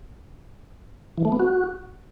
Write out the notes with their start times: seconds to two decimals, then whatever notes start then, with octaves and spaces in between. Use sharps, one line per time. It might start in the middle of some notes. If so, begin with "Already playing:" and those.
1.18 E3
1.25 A3
1.32 B3
1.40 F#4